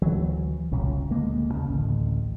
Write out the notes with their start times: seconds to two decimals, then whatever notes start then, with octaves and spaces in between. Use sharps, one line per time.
0.02 D2 E3 F#3
0.71 F#1 C2 A#2 C#3
1.11 D2 G#3 A#3
1.52 D#2 C#3
1.69 A1 D2